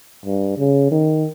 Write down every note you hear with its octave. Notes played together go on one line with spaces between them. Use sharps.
G2
C#3
D#3